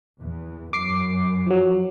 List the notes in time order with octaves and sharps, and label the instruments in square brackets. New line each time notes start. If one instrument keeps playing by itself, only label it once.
[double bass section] E2
[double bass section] F#2 [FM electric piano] D6 C7
[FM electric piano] F3 F#3